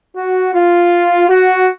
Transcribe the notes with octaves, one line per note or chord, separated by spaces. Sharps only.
F#4
F4
F#4